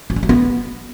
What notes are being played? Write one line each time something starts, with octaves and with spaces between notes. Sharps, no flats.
F#3
G3
F#3
B3